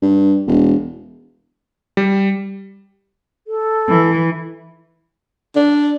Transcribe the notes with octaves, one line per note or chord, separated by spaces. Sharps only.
G2
E1
G3
A4
E3
D4